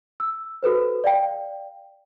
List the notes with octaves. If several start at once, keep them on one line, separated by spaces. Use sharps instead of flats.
E6
F#4 A4 B4 C5
D5 F5 G5